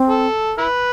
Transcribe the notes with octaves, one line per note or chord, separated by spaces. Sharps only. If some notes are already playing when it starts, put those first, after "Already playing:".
Already playing: C4
A4
E4 B4